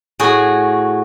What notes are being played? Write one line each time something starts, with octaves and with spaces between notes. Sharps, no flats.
A2 F#4 G#4